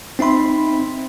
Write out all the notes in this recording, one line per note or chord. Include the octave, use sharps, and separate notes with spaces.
C4 D#4 E5 B5 C6